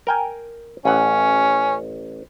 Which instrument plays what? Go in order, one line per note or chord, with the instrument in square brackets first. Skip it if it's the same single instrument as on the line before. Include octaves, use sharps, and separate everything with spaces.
[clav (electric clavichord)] A#4 G5 G#5
[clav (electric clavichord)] A1 F#5 [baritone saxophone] C#4